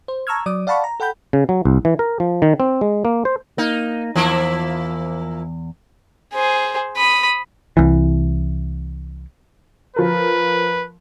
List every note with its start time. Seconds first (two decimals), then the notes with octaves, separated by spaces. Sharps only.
0.08 C5
0.27 A5 A#5 C#6 E6 F6 G#6
0.46 F#3 D5 D6 D#6
0.67 D5 F5 F#5 A5 B5 C#6
0.84 A#5
1.00 A4 F#5 G5 B5 G6
1.33 C#3
1.49 F#3
1.65 C2
1.85 E3
1.99 A#4
2.20 F3
2.42 D#3
2.60 C4
2.81 G#3
3.05 A#3
3.25 C5
3.58 A#3 D#4
4.16 E2 F3 A#3 E4
6.34 G#4 C5
6.96 B5 D#6
7.77 C2 E3
9.96 F3 A#4 B4